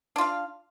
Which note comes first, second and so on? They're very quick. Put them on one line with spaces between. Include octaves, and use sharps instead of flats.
D4 F4 F5